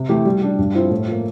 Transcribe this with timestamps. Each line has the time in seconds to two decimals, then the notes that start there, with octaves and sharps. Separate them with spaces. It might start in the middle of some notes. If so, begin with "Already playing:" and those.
Already playing: C3
0.09 E3 A3 E4 G4
0.25 G3
0.42 D4 G4
0.59 G2
0.75 F3 C4 E4
0.91 A2
1.07 F3 A#3